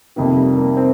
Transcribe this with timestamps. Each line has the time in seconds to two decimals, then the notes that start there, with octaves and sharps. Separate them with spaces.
0.16 F2 C3 D#3 A#3
0.37 G3
0.57 A#3
0.77 C4